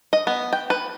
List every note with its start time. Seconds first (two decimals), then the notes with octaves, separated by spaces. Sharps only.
0.13 D#5
0.27 B3
0.53 G5
0.70 B4